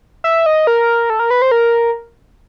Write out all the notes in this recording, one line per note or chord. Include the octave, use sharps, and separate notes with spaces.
E5
D#5
A#4
A4
A#4
B4
C5
A#4